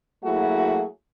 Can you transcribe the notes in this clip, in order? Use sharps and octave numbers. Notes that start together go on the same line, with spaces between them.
F#3 A3 A#3 E4 F#4 G#4